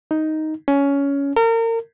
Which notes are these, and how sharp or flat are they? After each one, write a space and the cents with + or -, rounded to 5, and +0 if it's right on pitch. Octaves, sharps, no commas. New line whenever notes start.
D#4 +5
C#4 +15
A#4 -35